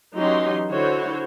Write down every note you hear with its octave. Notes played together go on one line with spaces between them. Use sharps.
E3 F#3 C#4 D#4 G4 C6
D3 E4 F#4 C5 C#5